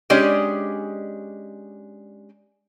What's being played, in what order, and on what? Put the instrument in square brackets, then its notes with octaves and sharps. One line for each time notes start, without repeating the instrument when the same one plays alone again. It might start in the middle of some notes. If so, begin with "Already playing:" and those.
[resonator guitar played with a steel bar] G#3 C#4 D4 G4 D5 D#5